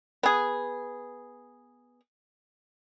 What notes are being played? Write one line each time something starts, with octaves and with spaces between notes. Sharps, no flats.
B3 G#4